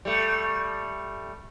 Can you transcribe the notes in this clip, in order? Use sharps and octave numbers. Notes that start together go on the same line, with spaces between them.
G3 A3